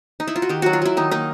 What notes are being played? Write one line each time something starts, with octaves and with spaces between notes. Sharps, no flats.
D#4
E4
F4
F#4
D#3 G4
F#3 F#4
F4
F#3 E4
D#3 D#4
A#3 D#4